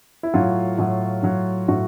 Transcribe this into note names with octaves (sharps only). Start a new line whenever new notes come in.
E4
A2 F#3 F4
A2 F#3
A2 F#3
A2 F#3 F#4